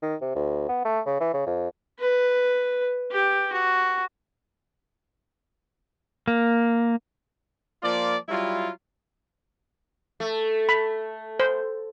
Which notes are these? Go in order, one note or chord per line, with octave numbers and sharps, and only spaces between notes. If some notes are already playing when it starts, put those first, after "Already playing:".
D#3
C3
D2
B3
A3
C#3
E3
C#3
F2
B4
G4
F#4
A#3
F3 A#3 F4 D5
F#3 G3 E4 F4
A3
B5
C5